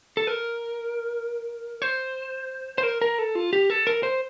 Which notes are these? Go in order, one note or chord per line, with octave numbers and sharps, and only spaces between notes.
A4
A#4
C5
C5
A#4
A#4
A4
F4
G4
A4
A#4
C5